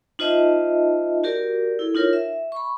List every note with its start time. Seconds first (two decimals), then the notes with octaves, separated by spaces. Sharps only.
0.19 D#4 F4 C5 D#5 E5 A5
1.24 F#4 G4 A#4 D5
1.79 E4 A4
1.94 D#4 F4 A#4 C#5
2.13 E5
2.52 B5 C#6